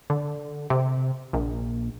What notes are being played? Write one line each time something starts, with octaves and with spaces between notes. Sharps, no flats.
D3
C3
A#1